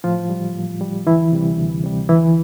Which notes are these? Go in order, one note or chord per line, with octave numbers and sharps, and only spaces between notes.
A2 F3 F4
G3
A2
G3
D2 E3 E4
C3 G3
D2
C3 G3
D2 E3 E4